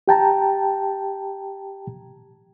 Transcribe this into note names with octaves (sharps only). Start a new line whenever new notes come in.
G4 G5 A5 A#5